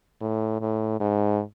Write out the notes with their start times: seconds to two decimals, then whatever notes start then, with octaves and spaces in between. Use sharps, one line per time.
0.21 A2
0.61 A2
1.00 G#2